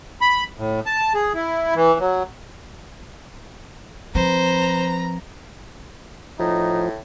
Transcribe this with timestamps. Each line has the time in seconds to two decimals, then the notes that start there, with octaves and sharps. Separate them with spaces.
0.21 B5
0.58 A2
0.86 A5
1.14 G#4
1.34 E4
1.76 E3
2.00 F#3
4.15 F3 C4 B4 C5 A#5
6.40 A2 F3 D#4